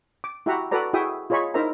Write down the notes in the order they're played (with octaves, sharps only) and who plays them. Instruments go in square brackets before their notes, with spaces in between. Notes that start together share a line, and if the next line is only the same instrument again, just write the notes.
[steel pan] D6
E4 F#4 G4 E5 F#5 A#5
F#4 A4 B4 D5 A#5
E4 F#4 G#4 E5 G5 D#6
F4 G#4 C#5 D#5 B5 C#6
D#4 E4 A#4 C5 E5 A#5